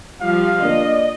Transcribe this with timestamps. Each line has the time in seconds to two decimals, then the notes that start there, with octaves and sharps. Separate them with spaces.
0.21 F3 G3 F5
0.62 D3 A#3 D5 D#5